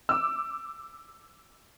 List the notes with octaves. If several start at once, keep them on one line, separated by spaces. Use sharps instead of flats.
D6 E6